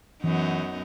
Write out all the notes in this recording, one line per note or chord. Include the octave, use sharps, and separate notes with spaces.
F#2 E3 B3 D#4